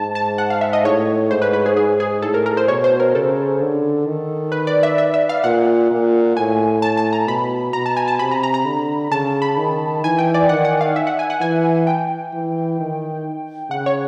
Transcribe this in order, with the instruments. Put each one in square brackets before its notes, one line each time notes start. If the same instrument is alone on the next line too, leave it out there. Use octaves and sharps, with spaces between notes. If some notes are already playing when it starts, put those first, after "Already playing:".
Already playing: [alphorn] G#2 [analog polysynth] A5
[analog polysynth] A5
F#5
F5
E5
D#5
[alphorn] A2 [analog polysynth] C#5
[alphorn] G#2 [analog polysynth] C5
[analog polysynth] B4
B4
G#4
[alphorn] G#2 [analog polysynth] G#4
[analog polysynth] G#4
[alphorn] A2 [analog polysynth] A4
[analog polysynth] A#4
A#4
C5
[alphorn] B2 [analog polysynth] C#5
[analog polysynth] C5
A#4
[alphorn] C#3 [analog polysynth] A4
[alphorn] D3
D#3
[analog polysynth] B4
D5
E5
E5
E5
F5
[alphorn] A#2 [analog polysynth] F#5
[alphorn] A#2
[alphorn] A2 [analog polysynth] G#5
[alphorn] A2 [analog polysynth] A5
[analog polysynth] A5
A#5
[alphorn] B2 [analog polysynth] B5
[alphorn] B2 [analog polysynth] A#5
[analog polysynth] A5
G#5
A5
[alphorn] C3 [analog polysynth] B5
[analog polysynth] A#5
A#5
A#5
[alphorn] D3
[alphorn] C#3 [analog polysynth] A5
[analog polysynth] B5
[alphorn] D#3
[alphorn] E3 [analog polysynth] G#5
[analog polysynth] G5
D5
[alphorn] D#3 [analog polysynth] F#5
[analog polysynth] F#5
F5
E5
F#5
G#5
F#5
[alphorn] E3 [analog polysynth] G#5
[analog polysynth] G5
[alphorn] E3
D#3
[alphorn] C#3 [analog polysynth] F#5
[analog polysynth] C#5